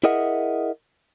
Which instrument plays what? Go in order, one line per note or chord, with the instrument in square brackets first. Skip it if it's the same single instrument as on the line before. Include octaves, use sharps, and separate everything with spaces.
[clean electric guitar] E4 G#4 A#4 D#5 E5 F#5